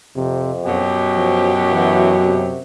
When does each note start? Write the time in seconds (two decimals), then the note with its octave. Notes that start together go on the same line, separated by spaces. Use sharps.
0.16 F2 C3
0.65 F#2 B2 F#3 G4
1.16 F3
1.72 E3
2.25 C3